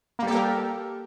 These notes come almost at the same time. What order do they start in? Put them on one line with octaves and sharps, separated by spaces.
A#3 G3 A4 G4 A#4